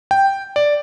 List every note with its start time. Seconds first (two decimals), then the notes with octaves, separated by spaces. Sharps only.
0.11 G5
0.56 D5